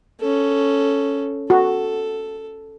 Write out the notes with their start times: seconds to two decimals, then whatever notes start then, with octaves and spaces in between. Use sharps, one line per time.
0.20 C#4 A4
1.50 F#4 A4